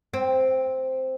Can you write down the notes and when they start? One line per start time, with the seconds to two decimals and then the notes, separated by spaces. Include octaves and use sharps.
0.14 C4